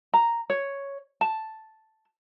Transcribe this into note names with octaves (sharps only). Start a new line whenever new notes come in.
A#5
C#5
A5